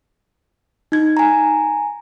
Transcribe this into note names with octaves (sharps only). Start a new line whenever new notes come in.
D#4 G#6
G#5 A#5